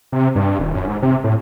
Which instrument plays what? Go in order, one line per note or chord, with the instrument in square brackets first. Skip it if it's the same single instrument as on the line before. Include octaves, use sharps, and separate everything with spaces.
[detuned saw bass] C3
G2
D#1
F#2
G#2
C3
A2